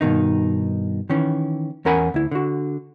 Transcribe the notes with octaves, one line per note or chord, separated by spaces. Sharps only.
G2 B2 D#3 D#4
D#3 E3 C#4
E2 C#4 A#4 F#5 G#5 B5
D2 E4
D3 F#4